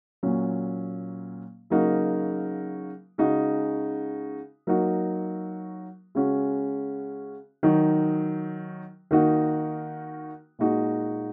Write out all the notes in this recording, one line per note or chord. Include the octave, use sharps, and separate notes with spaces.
A#2 F#3 C#4
C#3 F#3 A#3 D#4 F#4
C#3 G#3 D#4 F#4
F#3 A#3 D#4 F#4
C#3 G#3 C#4 F#4
D#3 F#3 D#4 F#4
D#3 A#3 D#4 F#4
A#2 G#3 D#4 F#4